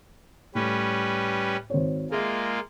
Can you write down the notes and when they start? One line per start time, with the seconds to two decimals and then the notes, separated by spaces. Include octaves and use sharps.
0.55 A2 G3 C#4 B4
1.70 G#1 C5 C#5
2.11 G#3 A#3 F4 G#4 E5